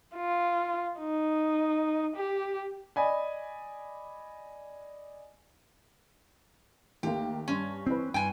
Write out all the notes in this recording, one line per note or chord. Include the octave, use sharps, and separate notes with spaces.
F4
D#4
G4
D5 D#5 G#5 B5
D#2 A3 A#3 G4
G2 C#4
E3 C4 B4
G2 G5 G#5